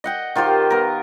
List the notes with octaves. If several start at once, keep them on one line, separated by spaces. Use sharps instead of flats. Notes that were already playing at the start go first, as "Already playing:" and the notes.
D#5 F#5 G5
D#3 F4 G4 C5
B3 A#4